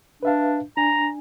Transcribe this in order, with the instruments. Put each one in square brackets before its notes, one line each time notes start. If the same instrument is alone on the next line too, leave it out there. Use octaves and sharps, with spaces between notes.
[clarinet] D4 [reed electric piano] B4 E5 F5
[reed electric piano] D4 G#5 [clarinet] A#5